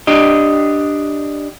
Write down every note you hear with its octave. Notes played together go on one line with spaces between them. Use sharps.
D4 G4 D#5